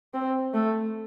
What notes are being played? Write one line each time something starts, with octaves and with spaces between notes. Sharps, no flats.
C4
A3